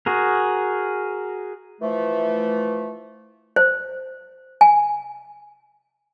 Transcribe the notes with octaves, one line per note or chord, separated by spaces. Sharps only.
F#4 G#4 A#4
E3 F3 A3
C5
G#5